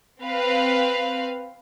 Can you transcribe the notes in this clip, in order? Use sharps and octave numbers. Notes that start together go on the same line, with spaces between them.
C4 B4 F5